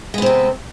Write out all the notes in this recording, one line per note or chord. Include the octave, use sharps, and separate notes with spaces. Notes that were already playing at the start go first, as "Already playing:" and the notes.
C3 G#3 B3 C4